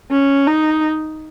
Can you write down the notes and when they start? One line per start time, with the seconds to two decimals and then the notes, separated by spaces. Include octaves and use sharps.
0.11 C#4
0.47 D#4